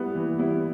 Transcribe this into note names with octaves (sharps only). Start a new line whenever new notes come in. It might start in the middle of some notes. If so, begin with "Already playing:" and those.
Already playing: G3 B3 E4
E3
G3 B3 E4